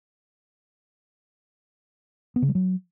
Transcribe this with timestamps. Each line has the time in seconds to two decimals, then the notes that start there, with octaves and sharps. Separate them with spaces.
2.36 B3
2.42 C#3
2.49 G3
2.55 F#3